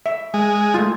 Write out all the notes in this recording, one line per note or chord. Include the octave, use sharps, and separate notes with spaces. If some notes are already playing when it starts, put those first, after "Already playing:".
E5
G#3
A3 F4